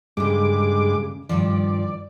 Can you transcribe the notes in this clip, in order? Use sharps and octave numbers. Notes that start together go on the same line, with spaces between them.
D2 G2 C#3 G#3 D6
G2 D#3 F3 D5